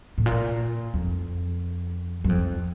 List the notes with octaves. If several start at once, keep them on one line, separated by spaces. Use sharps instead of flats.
A2
A#2
F2
F#2
F2